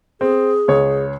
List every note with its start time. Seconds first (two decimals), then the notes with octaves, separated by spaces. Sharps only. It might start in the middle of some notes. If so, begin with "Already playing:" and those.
0.21 C4 G#4
0.68 C#2 C#5